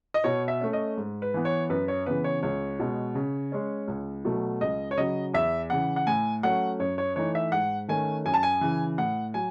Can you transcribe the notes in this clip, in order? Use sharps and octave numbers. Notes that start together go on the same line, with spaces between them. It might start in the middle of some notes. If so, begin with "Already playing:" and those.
D#5
B2 C#5
E5
A3 C#4
D#5
G#2
B4
E3 B3
C#5
F#2 B4
C#5
C#3 E3 B3 B4
C#5
C#2 C#5
B2 G#3
C#3
G#3 C#4
C#2
B2 F#3 A3
C#2 D#5
C#5
C#3 F#3 D#5
E2 E5
C#3 E3 F#5
F#5
A2 G#5
F#3 A3 C#4 F#5
F#2 C#5
C#5
E3 A3 D#4 C#5
E5
G#2 F#5
D#3 A3 C#4 G#5
F#2 G#5
A5
G#5
C#3 E3
A2 F#5
F#3 G#5